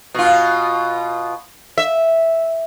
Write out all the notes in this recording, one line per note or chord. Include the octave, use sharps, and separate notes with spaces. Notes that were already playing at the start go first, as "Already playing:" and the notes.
B2 F4
E5